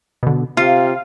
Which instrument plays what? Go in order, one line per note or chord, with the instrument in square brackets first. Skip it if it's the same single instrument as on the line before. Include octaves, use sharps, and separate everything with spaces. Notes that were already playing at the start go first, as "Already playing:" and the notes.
[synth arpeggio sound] B2 D3
[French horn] C3 [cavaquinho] F4 [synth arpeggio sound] F5